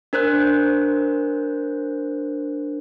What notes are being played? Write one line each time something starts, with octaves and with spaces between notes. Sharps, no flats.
D4 A#4 C5 F#6 G6